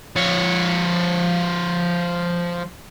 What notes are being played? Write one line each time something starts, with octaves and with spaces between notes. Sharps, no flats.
F3 C#5